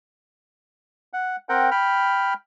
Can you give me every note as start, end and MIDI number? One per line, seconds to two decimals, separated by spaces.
1.13 1.36 78
1.49 1.70 60
1.49 1.70 70
1.49 1.70 78
1.49 1.70 79
1.71 2.34 79
1.71 2.34 83
1.71 2.34 89